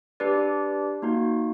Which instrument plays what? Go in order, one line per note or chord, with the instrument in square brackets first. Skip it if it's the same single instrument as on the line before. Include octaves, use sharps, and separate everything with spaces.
[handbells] D4 G4 B4 D5
A#3 D#4 F#4